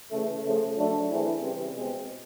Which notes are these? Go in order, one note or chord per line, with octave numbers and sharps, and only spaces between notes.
C#3 E3 A3
C#3 F3 A3
F#3 A3 D4
E3 A3 C4 E4 G#4
C#3 E3 G3 C4
B2 G#3 C4